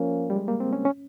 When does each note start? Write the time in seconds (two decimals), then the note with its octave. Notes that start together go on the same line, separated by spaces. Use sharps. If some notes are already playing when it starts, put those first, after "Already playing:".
Already playing: F3 A#3 C#4
0.30 G3
0.36 G#3
0.48 A#3
0.60 C4
0.73 C#4
0.85 C#4